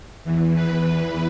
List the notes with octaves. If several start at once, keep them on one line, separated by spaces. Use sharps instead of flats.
E2 E3
B4